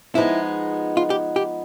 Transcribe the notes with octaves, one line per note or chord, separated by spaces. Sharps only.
F3 G#3 B3 D#4 E4 G#4
F4
G4
G4